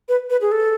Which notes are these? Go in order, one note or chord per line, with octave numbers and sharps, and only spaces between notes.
B4
B4
G#4
A4